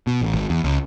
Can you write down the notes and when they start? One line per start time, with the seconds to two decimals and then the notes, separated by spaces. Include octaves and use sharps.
0.07 B2
0.21 A1
0.34 G#1
0.50 E2
0.64 C#2